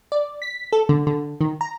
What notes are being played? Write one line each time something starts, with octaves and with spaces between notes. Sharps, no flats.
D5
B6
A4
D3
D3
D#3
A#5